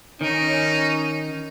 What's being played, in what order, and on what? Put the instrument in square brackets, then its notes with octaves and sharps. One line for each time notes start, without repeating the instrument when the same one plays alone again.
[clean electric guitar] D#3 [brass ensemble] C#4 [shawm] D#4